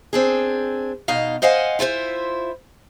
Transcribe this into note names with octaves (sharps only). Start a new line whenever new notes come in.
C4 D4 G#4
B2 D#4 D#5 F5
C5 D#5 F5 F#5 G#5
E4 F4 A4 C5 E5